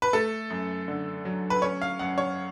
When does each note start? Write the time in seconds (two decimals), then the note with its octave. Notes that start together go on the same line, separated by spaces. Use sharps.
0.02 B4
0.13 A3 A4
0.50 F#2
0.88 D3
1.25 F#3
1.50 B4
1.62 C#4 C#5
1.82 F5
1.99 F#2 F#5
2.18 C#5